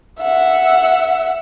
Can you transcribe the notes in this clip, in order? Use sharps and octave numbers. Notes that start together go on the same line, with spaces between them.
E5 F#5